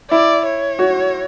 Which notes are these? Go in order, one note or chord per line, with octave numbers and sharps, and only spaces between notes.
E4 D5
C#5
F#4